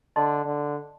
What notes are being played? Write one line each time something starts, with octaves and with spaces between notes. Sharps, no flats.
D3 A4 D#5 A5 C6
D3